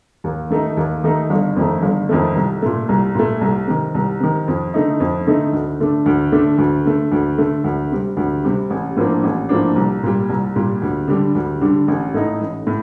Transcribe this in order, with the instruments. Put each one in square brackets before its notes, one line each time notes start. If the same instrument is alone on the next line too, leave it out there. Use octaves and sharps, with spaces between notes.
[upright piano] D#2
D#3 A3 D#4
D#2
D#3 A3 D#4
G1
F2 D#3 A3
G1
F2 D#3 A3
C2
A#2 A3
C2
A#2 A3
C2
C3 D#3
C2
C3 D#3
F2
D3 A3 D#4
F2
D3 A3 D#4
D2
D3 A3 D4
D2
D3 A3 D4
D2
D3 A3
D2
D3 A3
D2
C3 G3
D2
C3 G3
A1
A2 F3 A#3 D4
A1
A2 F3 A#3 D4
C2
A#2 G3
C2
A#2 G3
D2
D3 G3 D4
D2
D3 G3 D4
A1
A2 A3 D#4
A1
A2